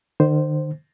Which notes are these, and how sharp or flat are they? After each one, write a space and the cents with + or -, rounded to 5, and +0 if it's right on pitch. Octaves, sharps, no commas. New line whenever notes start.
D#3 -45 C5 +0